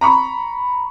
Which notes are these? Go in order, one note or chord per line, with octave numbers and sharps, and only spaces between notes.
A#5 B5 C#6